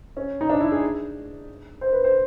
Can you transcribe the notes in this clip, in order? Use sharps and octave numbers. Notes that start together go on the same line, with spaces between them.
C#4
D#4
D4
E4
G#4
C5
B4
C5